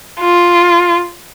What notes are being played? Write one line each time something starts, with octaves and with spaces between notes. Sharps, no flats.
F4